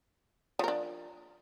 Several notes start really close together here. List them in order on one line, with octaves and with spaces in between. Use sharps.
F3 A#4 D4